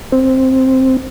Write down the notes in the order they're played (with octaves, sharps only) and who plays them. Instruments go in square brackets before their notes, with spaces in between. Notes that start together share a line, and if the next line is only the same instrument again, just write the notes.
[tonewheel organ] C4